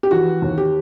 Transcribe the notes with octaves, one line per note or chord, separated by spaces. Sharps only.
G4
E3 F#4
D#2
G4